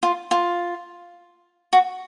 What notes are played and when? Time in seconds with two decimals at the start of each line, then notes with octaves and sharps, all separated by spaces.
0.03 F4
0.31 F4
1.73 F#4